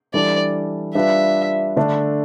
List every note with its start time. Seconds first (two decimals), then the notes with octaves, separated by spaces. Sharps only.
0.14 E3 G3 D4 A4 D5
0.95 G3 D4 F4 B4 E5
1.77 D3 A3 D4